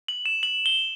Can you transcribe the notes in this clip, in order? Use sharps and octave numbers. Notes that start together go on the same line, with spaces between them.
F#7
E7
F#7
G7